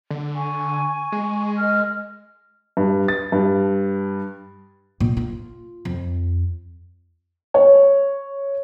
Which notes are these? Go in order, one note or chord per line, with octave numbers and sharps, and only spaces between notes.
D3
G#5 C#6
G#3
A#4 D#5 F6
G2
A6
G2
A#2
F4
F2
C#5